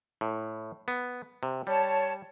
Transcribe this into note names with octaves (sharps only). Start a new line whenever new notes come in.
A2
B3
C3
G3 C#5 A5